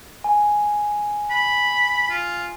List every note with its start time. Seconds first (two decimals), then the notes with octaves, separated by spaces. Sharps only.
0.24 G#5
1.30 B5
2.10 F4